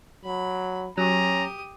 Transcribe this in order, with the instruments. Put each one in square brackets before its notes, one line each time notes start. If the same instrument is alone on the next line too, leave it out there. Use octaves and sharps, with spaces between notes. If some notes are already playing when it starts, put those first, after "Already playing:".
[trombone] F#3 [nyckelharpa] B5
[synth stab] F#3 [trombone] C#4 [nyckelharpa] G4 D#6 [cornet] A#5